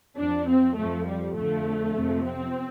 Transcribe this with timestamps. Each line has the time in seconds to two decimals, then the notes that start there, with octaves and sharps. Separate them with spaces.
0.17 F2 F3 D4
0.48 C4
0.76 F2 F3 A3
1.07 G3
1.36 F2 D3 F3 A3
1.94 F2 C3 F3
2.24 C4